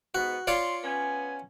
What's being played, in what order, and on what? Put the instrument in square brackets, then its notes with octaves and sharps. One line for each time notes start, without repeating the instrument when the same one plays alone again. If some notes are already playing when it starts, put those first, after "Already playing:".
[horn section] G#2 B3 [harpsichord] F#4
[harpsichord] F4 C#5 D5 [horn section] C6
[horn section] B3 C#4 G#5